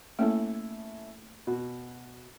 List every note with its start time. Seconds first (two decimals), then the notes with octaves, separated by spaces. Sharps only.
0.19 A3 A#3 C#4 E4 A4
1.47 B2 F#4